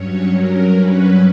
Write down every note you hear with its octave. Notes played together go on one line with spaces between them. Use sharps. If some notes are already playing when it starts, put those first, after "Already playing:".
Already playing: G2 F#3 C#4 C#5
A#4
B4